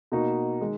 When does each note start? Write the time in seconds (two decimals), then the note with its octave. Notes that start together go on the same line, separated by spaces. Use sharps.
0.12 B2 A#3 D#4 F#4 A#4
0.61 D#3 G#3